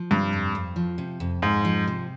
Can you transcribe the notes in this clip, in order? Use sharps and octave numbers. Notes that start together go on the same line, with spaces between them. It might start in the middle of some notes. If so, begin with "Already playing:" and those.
Already playing: F3
G2 C3
F2
F2
F3
C3
F2
F2 G#2
F3
C3